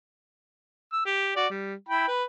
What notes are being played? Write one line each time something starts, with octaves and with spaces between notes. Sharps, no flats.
E6
G4
F#4 D5
G3
E4 G5 B5
B4